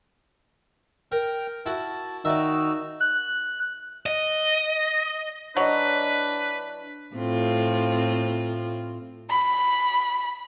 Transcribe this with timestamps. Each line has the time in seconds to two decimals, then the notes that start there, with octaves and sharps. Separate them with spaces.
1.12 A#4 G5 F6
1.66 E4 F#4 A5
2.25 D#3 D#4 F#4 D5 E5 E6
3.00 F#6
4.06 D#5
5.57 F#3 D4 E4 B4 D#5
7.16 A2 C4 F4
9.30 B5